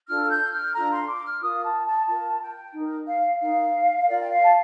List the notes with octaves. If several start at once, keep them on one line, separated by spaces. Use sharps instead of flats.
D4 F4 A4 F6
G6
F6
D4 F4 A4 A#5
C6
D6
F6
F4 A#4 D#6
A5
A5
F4 A#4 A5
G5
D#4 A#4
F5
D#4 A#4 F5
F4 A#4 D5
G5
F5
A5